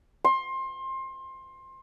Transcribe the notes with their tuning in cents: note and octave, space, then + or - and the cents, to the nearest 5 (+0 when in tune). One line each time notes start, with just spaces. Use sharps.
C6 +25